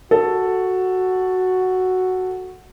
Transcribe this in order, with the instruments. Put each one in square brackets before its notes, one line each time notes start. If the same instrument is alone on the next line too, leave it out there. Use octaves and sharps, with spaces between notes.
[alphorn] F#4 [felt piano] A4